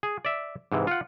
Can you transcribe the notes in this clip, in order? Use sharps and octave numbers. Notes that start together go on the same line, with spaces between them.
G#4
D5 E5
G#2 C3 E3
F4 F#5